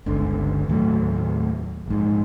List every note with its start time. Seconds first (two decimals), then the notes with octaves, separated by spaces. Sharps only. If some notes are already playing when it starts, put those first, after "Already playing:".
0.06 G1 C#2 D3
0.68 D#2 A2 F#3 A3
1.86 A#1 G#2